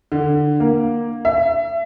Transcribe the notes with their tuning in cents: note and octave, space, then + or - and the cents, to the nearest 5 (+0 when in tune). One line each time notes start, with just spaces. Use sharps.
D3 +10
A#3 +5
E5 +30